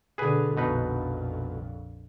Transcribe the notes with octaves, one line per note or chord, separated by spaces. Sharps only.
B2 D3 G#4 B4 G#5
A#1 F2 B2 D#4 B4